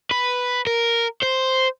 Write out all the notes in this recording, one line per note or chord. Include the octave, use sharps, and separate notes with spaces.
B4
A#4
C5